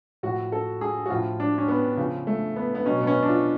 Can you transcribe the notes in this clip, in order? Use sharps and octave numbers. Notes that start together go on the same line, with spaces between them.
A2 F3 F#4
A4
G#4
F#4
A2 F3 F4
D4
C#4
B3
C#3 F3
A3
B3
B3
B2 F#3 C#4
B3
C#4
D4
F4